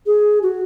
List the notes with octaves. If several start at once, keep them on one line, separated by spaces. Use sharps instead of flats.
G#4
F#4